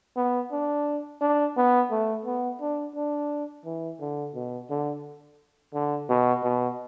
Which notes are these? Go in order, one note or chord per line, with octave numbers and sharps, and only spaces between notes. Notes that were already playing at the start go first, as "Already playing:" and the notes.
B3
D4
D4
B3
A3
B3
D4
D4
E3
D3
B2
D3
D3
B2
B2